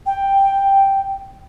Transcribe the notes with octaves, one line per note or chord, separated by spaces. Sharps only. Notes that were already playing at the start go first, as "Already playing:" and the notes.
G5